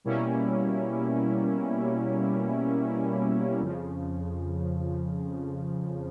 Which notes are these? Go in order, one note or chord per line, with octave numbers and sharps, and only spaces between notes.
B2 G3 A#3 C#4 E4
F2 C#3 F3